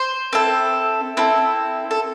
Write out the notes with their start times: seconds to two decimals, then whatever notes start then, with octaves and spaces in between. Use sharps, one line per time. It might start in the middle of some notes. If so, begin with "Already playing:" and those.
Already playing: C5
0.33 C4 E4 A4
1.17 C4 E4 A4
1.91 A4